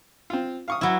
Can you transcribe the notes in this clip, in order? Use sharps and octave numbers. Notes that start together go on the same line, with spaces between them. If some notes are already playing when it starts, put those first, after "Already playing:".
C4 F4
F5 C#6 D#6
F#3 E4